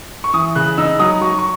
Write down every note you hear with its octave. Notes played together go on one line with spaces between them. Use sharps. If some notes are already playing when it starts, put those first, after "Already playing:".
C#6
E3 D#6
C#3 F#6
D#4 E6
F#3 D#6
F#3 C#6
C#6